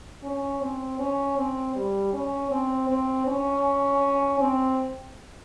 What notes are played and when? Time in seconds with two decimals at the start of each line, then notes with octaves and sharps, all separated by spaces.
0.23 C#4
0.61 C4
0.99 C#4
1.38 C4
1.75 G3
2.13 C#4
2.51 C4
2.89 C4
3.27 C#4
4.40 C4